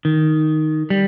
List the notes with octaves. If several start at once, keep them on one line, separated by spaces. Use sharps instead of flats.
D#3
G3